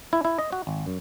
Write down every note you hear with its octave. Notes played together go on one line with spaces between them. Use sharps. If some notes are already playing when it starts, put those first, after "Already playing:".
E4
E4
D#5
F#4
G#1
F#2